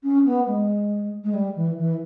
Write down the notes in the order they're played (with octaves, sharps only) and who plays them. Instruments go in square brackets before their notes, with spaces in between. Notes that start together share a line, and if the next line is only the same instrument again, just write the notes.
[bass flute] C#4
B3
G#3
G#3
G3
E3
E3